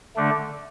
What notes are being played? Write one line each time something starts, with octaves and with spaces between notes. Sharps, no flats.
D3 A3 D4